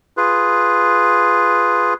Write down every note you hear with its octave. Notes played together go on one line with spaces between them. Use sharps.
F4 G#4 B4